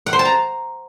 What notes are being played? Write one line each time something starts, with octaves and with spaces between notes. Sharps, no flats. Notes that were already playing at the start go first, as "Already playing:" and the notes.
F#5
C5
A5
A#5